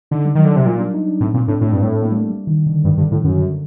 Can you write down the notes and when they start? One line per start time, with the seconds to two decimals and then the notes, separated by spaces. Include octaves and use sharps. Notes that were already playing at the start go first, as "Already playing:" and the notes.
0.11 D3 D#4
0.25 G3
0.35 D#3 F#3
0.45 D3
0.53 C3 F#3
0.66 A#2 G3
0.79 D4
0.94 D#4
1.07 D4
1.21 A2 C4
1.34 A#2 C4
1.48 A2 D4
1.61 A2 D4
1.72 G2 C4
1.82 A2
2.02 A#3
2.11 G3
2.15 A3
2.30 G3
2.47 D#3
2.66 D3
2.84 G2 D#3
2.97 G2
3.02 D3
3.11 A2
3.20 F#2 D#3
3.39 D3